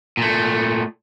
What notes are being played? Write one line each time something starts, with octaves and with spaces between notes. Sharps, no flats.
A#2 A3